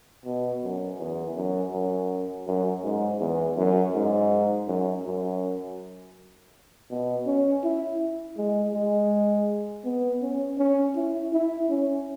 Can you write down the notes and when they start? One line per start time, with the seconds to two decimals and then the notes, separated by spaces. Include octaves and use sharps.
0.25 B2
0.63 F#2
0.99 E2
1.36 F#2
1.73 F#2
2.47 F#2
2.84 G#2
3.20 E2
3.57 F#2
3.95 G#2
4.68 F#2
5.06 F#2
6.90 B2
7.27 C#4
7.64 E4
8.37 G#3
8.74 G#3
9.85 B3
10.22 C#4
10.58 C#4
10.95 E4
11.33 E4
11.69 C#4